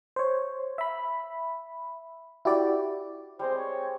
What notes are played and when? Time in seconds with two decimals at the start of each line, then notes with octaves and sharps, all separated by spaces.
0.16 C5 C#5
0.78 E5 B5
2.45 E4 F#4 G4 D5
3.39 G3 G#3 C4 C5
3.57 C#5